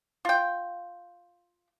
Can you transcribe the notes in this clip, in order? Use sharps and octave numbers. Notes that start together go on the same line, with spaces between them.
F4 G5